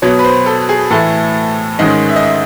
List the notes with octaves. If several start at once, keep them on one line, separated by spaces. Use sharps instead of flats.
B2 F#3 B3 C#5
B4
C5
A4
G#4
A2 E3 A3 A4
G#2 D#3 G#3 C#4 D#5
E5
D#5
E5